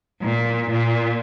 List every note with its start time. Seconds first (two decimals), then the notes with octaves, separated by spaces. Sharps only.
0.22 A#2
0.71 A#2